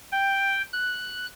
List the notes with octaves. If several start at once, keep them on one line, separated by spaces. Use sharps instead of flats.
G5
F#6